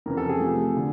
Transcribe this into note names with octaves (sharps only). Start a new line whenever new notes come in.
F2 C#3 E3 A#4
A4
G#4
C3 F3 A3
D3